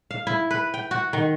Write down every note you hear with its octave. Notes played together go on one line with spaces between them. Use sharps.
F5
E4
B4
G5
F#4
D#3